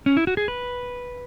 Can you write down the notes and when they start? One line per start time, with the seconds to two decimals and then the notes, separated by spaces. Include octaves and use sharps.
0.06 C#4
0.17 E4
0.27 F#4
0.37 G#4
0.48 B4